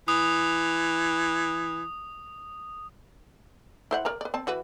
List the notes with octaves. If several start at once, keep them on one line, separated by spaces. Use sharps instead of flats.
E3 D#6
E4 C5 F#5
A#4 D5 A#5
B4 D5
C4 A5
E3 F#4 B4